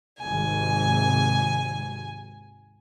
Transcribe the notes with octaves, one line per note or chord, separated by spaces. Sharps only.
G#1 D#2 C3 G#5